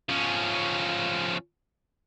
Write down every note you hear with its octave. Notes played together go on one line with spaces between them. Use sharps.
F3 C#4